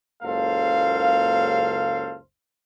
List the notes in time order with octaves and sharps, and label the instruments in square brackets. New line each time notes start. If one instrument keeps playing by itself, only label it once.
[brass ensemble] F#1 C#2 A#3 A4 C5 F5